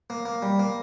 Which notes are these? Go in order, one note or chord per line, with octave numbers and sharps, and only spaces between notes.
A#3
A#3
G3
A#3